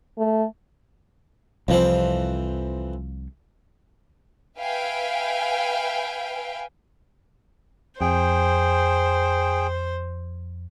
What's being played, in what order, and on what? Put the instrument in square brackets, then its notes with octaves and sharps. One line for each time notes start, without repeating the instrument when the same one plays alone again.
[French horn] A3
[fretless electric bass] C2 F3 [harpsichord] F2 E3 C4
[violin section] B4 E5 F5 G5 G#5
[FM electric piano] F2 [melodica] G#4 G5 [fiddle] C5